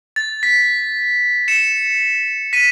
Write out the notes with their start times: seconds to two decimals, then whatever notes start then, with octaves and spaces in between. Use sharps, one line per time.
0.16 A6
0.43 B6
1.48 C#7 E7
2.53 B6 D#7